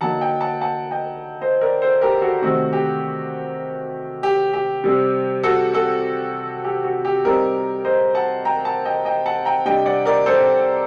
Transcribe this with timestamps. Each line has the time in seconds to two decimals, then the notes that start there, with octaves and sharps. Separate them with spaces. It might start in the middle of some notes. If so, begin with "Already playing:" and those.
0.01 D3 F#3 A#3 D#4 F#5 A5
0.21 D#5 G5
0.41 F#5 A5
0.61 F#5 A5
0.91 D#5 G5
1.41 C5 D#5
1.61 A#4 D5
1.82 A4 C5
2.01 G4 A#4
2.22 F#4 A4
2.42 C3 D#3 A3 C4 F#4
2.73 G4
4.23 G4
4.53 G4
4.84 C3 G3 C4
5.43 F#4 A4
5.73 F#4 A4
6.64 G4
6.84 F#4
7.05 G4
7.25 C3 G3 C4 D#4 G4 A#4
7.85 C5 D#5
8.15 F#5 A5
8.45 G5 A#5
8.65 F#5 A5
8.85 D#5 G5
9.05 D#5 G5
9.26 F#5 A5
9.45 G5 A#5
9.65 C3 G3 D4 D#5 G5
9.86 D5 F#5
10.05 A#4 D5
10.26 A4 C5